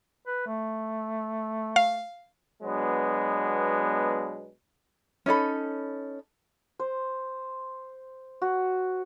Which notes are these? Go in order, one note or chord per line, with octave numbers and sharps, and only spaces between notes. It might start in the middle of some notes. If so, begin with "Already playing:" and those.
B4
A3
F5
B2 F#3 G#3 B3 D4
C#4 D#4 A4 B5
C5
F#4